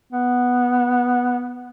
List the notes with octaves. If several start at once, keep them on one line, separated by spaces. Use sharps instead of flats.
B3